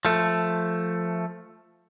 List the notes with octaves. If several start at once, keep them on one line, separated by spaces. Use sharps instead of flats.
F3 A3